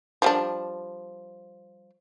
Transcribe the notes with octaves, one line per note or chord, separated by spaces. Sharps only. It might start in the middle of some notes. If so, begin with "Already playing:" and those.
F3 G3 D4